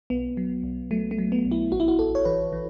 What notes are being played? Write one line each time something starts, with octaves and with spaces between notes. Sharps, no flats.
B1 B3
F#3
B1
F#3 A3
A3
F#3
B3
B1
E4
A1 F#4
E4
F#4
A1 A4
C#5
E3 B4
E3